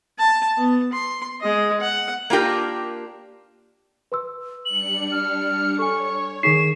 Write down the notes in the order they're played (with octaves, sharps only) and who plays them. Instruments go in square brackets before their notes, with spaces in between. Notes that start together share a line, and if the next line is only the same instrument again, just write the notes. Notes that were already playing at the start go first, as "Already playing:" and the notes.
[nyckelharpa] A5
B3
C6
G#3 D#5
F#5
[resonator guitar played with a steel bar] A#3 D4 F4 G4 A#4
[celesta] B4 C6 E6
[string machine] G3 D4 C#7 [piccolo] F#7
[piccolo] F6
[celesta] A4 G#5 [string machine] C#5 [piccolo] C#6
[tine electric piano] D#3 G#4 C7 [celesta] D#4 C#6 B6 [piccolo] E7